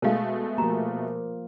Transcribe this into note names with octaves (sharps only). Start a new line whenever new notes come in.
B2 G#3 A3 A#4 F5
F3 A#3 F#4 G4 A#5